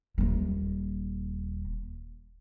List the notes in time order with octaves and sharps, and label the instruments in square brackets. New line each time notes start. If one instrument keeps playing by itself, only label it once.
[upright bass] D#1 A#3